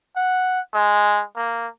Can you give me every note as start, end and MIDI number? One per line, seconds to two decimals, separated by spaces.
0.16 0.60 78
0.74 1.23 56
1.36 1.67 58